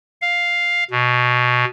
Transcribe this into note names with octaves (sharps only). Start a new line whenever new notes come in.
F5
B2